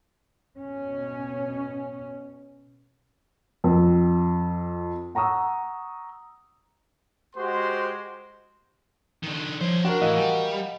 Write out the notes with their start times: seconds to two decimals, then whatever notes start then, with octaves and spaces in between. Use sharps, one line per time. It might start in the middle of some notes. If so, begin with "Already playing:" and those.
0.58 B2 C#4
3.64 F2
5.15 F#5 A#5 C#6 D#6 E6
7.36 G#3 F#4 G4 C5 F#5 C6
9.23 D#3 D4
9.61 F3 E4 C5 C#5
9.85 D4 F#4 A#4
10.01 A2 E3 D#5 F5 F#5
10.17 G3 G5 G#5